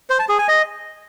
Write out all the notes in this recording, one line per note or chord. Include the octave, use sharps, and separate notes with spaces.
C5
A5
G#4
G#5
D#5